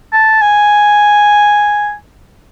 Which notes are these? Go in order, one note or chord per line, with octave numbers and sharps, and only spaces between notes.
A5
G#5